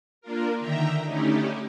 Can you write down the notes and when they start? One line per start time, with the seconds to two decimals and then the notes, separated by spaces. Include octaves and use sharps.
0.21 A#3 D4 F4 A#4
0.59 D3 D#3 E5 G5 A#5
1.06 D3 A3 C#4 D#4 E4 G4